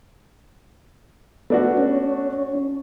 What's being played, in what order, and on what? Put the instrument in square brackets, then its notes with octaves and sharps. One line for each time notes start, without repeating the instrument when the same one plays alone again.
[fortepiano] A3 D4 F#4 [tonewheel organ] B3
[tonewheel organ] C#4